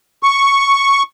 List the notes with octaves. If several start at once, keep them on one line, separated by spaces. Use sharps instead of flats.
C#6